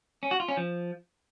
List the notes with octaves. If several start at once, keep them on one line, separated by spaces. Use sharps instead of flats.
C#4
F#4
F4
C#4
F3